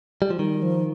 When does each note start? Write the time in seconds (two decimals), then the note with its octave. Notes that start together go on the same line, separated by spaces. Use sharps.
0.22 G3
0.30 F3
0.39 D#3 G3
0.62 F3